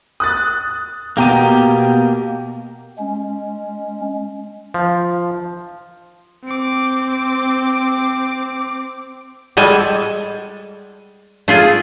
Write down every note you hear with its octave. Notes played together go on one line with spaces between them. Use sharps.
D#6 F#6 A6
B2 A#3 G4 A#5 D6 D#7
G#3 C#4
F3
C4 D6
G3 G#3 A4 G#5 A5
A3 F4 G#4